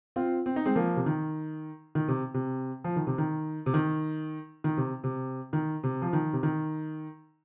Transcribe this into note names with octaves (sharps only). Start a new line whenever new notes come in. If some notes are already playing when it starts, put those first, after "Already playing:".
C4 F4
C4
D#4
G#3 C4
F3 A#3
C3
D#3
D#3
C3
C3
F3
D#3
C3
D#3
C3
D#3
D#3
C3
C3
D#3
C3
F3
D#3
C3
D#3